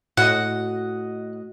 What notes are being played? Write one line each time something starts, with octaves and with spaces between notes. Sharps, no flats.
A2 F#4 D#5 F#5